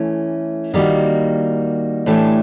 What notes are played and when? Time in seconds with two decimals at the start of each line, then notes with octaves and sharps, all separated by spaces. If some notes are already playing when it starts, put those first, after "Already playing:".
Already playing: E3 A3 C#4
0.74 D#3 G3 A#3 D#4 F#4
2.06 A2 E3 A3 D4 G4